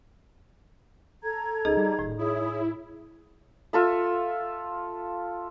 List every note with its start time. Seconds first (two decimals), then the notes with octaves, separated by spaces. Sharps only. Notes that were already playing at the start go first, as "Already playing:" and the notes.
1.23 A4 A#5 G#6
1.65 C#2 D#4 G#4 D#5
1.77 G3
1.99 D#1 A2
2.19 E4 G#4 C#5 D#6
3.73 F4 A4 E5